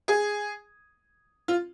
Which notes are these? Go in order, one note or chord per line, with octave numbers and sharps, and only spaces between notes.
G#4
F4